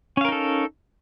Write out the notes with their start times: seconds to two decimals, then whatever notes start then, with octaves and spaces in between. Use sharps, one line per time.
0.17 C#4
0.21 F5
0.25 A#4
0.28 D#4
0.32 A4